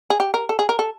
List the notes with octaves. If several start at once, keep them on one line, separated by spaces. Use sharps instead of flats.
G#4
G4
A#4
A4
G#4
A#4
A4